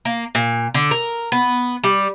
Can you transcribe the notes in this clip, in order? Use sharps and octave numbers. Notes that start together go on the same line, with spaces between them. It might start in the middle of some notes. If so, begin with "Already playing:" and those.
A#3
A#2
D3
A#4
B3
G3